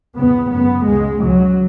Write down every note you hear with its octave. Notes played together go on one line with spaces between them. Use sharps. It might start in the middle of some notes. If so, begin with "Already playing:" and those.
E2 C#3 B3
F#2 C#3 B3
C#2 C#3 G#3
C#2 C#3 F#3